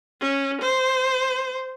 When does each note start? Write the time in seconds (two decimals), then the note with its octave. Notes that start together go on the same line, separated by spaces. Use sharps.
0.21 C#4
0.61 C5